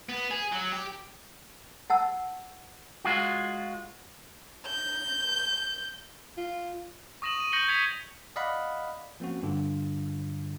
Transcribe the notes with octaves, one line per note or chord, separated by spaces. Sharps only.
B3
G#4
F#3
G4
F#5 A5 E6
G#3 F4 F#4
G6
F4
C#6 D#6 A#6 E7 F#7
D#7
C#6 G6 A#6 C#7 F#7 G7
C#6 G#6 B6 C#7 F7
D5 D#5 F5 F#5 B5
F3 A#3 C4 C#4 F#4
G2 D3 F4